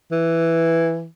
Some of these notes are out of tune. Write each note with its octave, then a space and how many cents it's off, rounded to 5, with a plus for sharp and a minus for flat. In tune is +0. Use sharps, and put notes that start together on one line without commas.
E3 +5